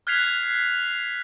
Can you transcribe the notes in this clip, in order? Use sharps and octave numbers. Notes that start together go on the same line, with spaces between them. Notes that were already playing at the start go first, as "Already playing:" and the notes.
F6 F#6 G#6 B6 C7 F7